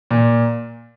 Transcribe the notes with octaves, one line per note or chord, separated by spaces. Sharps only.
A#2